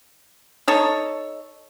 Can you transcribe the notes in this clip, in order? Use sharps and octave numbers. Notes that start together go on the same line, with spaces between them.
D#4 A4 C#5